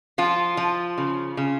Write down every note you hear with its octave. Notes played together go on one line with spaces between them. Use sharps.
F3 F4
F3
C#3
C#3